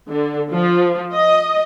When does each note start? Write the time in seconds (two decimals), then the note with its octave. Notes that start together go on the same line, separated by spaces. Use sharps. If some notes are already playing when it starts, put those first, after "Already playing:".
0.10 D3
0.53 F3
1.14 D#5